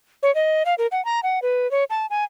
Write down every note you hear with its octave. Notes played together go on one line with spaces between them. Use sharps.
C#5
D#5
F5
A#4
F#5
A#5
F#5
B4
C#5
A5
G#5